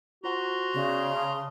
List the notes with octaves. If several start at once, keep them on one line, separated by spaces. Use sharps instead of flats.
F4 F#4 C5 F#5 A#5 C6
C#3 B3 C#4 D5
D#5 A5 D#6